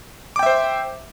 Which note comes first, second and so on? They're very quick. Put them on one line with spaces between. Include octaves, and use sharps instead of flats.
D6 G5 E5 C5